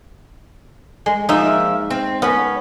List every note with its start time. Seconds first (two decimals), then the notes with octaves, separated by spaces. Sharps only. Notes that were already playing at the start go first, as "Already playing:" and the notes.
1.06 G#3
1.29 F3 A#3 D#4 E5
1.90 C4
2.22 B3 C#4 B5